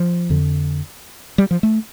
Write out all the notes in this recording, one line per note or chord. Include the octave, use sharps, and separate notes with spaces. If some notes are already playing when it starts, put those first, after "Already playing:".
Already playing: F3
F2 D3
G3
F3
A3